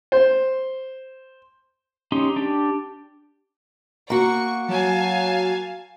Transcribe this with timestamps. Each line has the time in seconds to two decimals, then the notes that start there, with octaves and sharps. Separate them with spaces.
0.12 C5
2.12 C#4 D#4 G4 C6
2.36 D4 G4
4.10 A#3 F#4 C#6
4.68 F#3 F5 G#5 A5